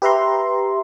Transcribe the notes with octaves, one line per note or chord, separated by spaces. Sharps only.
G4 B4 E5 A#5 C6